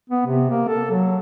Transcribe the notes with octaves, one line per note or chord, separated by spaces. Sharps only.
B3
C3
A#3
A4
F#3